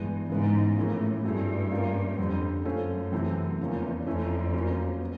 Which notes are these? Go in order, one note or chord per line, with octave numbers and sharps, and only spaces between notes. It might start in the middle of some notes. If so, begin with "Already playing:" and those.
Already playing: G2 E3 G#3 B3
G#2 C#3 E3 G#3 B3
A2 F3 A#3 C#4 E4 G#4
G2 F#3 A3 C4 E4 G#4
A#3 C#4 F4
F2 D3 G3 C4
F#2 A3 C#4 F4 A4 C5
C3 E3 A3 C4 E4
E2 C#3 F3 A#3 C#4 F4
F2 A3 C#4 E4
F#3 A#3 C#4 F4
B3